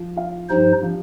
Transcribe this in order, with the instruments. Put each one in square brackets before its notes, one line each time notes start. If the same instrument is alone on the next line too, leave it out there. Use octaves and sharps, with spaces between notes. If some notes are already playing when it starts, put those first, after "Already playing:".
Already playing: [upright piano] F3 F4
F4 F5
[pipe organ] G2 F3 D#4 C5 [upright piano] G3 G4
[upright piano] F3 F4